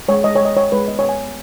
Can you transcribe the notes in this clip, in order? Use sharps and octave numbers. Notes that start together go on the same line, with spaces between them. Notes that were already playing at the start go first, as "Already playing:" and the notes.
G#3 C#5
G#3 D#5
C#5
G#3 D#5
G#3 C#5
G#3 B4
B3 D#5
C#5
B3 G#5
B3